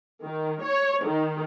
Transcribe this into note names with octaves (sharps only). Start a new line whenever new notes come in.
D#3
C#5
D#3